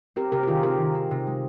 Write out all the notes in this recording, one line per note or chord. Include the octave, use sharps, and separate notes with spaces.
C4 G4 A#4
C3 G4 A#4
G4
D#3 F4 G#4
C4 G4 A#4
D#3
C4
C3
G#3